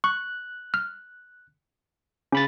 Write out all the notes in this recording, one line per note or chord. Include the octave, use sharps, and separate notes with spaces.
C#6 F#6
F6
C#3 C#4 B5 A6